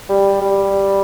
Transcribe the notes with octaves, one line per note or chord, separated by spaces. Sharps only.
G3
G3